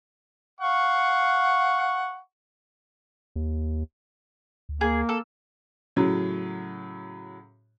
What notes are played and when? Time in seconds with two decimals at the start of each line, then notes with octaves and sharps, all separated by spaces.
0.61 F5 F#5 C#6
3.36 D#2
4.69 D2
4.81 A#3 G#4
5.09 A4
5.96 A2 C#3 F#3